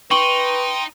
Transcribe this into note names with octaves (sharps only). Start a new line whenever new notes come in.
D#4 B4 G5 C6 C#6 F#7 G7